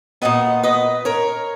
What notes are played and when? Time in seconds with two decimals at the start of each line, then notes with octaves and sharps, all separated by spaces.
0.22 A#2 G#3 B3 D#5 F#5
0.63 B4 D#5
1.05 A#4 C#5